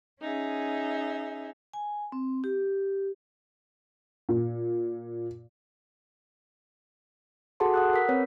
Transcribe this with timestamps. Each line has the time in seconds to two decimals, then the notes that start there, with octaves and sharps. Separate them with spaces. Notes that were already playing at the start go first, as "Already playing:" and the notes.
0.21 C#4 D#4 G#4 E5
1.74 G#5
2.12 C4
2.44 G4
4.29 A#2
7.60 F#4 G#4 A4 F#5 A5 C6
7.74 F#5 D#6 F#6
7.93 A#4 B6
8.09 C4 B4 C#5